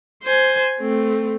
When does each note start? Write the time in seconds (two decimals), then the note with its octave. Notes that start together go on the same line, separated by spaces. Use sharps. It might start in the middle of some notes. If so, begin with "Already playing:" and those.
0.24 C5 G#5
0.80 A3 C4